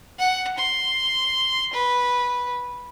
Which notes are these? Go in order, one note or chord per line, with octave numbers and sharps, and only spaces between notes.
F#5
C6
B4